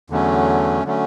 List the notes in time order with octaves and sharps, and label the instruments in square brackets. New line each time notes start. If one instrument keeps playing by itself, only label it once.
[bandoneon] E2 D3 F#3 A3 C#4
D3 F#3 A3 C#4